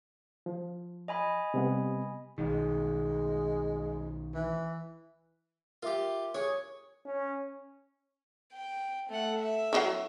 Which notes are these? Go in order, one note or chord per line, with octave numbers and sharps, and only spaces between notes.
F3
D#5 G#5 B5
C3 G3 B3
B1 D#3 G#3
E3
F4 G4 A#4 E5 D6
G#4 C#5
C#4
G5
A3 F#5
E5
F#3 D#4 E4